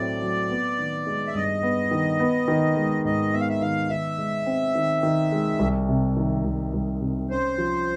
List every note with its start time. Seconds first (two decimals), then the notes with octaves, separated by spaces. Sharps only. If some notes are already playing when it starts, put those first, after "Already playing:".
Already playing: A2 F#3 A3 C4 D5
0.22 F#3
0.50 B3
0.78 D#3
1.07 G#3
1.27 E5
1.35 G2 D#5
1.63 B3
1.91 D#3
2.20 B3
2.48 D#3
2.77 G#3
3.05 G#2 D#5
3.33 B3 E5
3.41 F5
3.49 E5
3.61 D#3 F5
3.90 D#3 E5
4.18 G#3
4.47 C4
4.75 D#3
5.03 D#3
5.32 G#3
5.59 C2
5.89 C3
6.17 D#3
6.45 C2
6.73 C2
7.01 C3
7.30 C#4 C5
7.58 F3